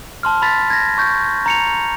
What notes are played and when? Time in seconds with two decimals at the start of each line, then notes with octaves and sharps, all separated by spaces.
0.23 A5 C6 F6
0.42 B5 C6 A6 B6
0.70 G#6 A#6
0.98 C#6 G6
1.46 A#5 C#7 F7